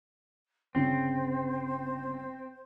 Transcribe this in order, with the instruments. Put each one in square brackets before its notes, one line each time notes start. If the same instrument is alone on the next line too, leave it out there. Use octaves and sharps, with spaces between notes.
[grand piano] G1 C#3 [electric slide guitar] C4 [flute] C5